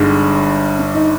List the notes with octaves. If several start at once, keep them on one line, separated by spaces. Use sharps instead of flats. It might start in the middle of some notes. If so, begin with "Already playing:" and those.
Already playing: G1 G2 D3 G#3 D#4
D4
D#4